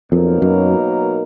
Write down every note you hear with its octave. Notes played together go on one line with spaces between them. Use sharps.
F2 B2 F#3 A#3 D#4 A#4
F#2